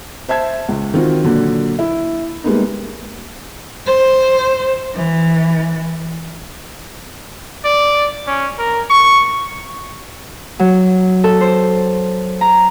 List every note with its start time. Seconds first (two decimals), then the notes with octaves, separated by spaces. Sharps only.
0.29 C5 E5 A5 G#6
0.69 C#2
0.94 D#3 C4 F4 F#4
1.23 A#2 D3 F#3
1.79 E4
2.44 G3 G#3 A#3 B3 D#4
3.86 C5
4.94 E3
7.65 D5
8.27 C#4
8.59 A#4
8.90 C#6
10.59 F#3
11.24 A4
11.41 C5
12.41 A#5